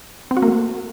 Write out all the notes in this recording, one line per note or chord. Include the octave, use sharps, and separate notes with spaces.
C4
F#4
A#3
A3